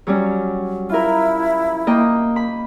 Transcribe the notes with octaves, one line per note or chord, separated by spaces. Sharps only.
F#3 G3 C#4
E4 F4 A#4
A#3 D#5 G5
B5